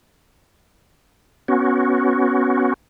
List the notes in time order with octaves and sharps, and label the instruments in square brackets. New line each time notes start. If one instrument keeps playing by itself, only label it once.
[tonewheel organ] B3 C#4 F#4